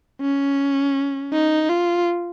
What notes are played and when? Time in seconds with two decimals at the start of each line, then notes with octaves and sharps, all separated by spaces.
0.22 C#4
1.33 D#4
1.69 F4